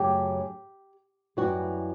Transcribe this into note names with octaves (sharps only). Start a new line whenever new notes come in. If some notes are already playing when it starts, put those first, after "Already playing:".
Already playing: F#2 C#3 F#3 A3 G4
F#2 E3 G3 F#4